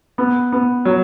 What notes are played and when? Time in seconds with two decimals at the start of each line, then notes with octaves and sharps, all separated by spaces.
0.18 B3
0.52 B3
0.85 F#3